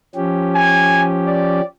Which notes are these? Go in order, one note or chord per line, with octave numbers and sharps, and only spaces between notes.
F3 C#4 G4
G#5
D5